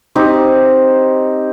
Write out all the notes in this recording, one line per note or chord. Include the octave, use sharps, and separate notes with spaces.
C4 D#4 G4